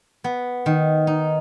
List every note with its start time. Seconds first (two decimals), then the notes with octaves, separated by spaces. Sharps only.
0.24 B3
0.66 D#3
1.07 D#4